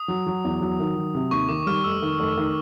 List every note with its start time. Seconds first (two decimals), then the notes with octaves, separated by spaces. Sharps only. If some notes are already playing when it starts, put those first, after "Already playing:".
Already playing: D#6
0.08 F#3
0.27 F#3
0.44 E2
0.61 F#3
0.80 D#3
0.96 F#3
1.15 C3
1.31 D#2 C#6
1.49 D#3 D6
1.67 G3 F6
1.84 F1 E6
2.02 D#3
2.20 F1
2.37 D#3